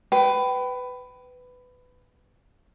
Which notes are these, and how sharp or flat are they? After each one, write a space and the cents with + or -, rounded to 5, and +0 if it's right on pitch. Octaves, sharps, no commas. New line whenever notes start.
B4 +15 G5 -25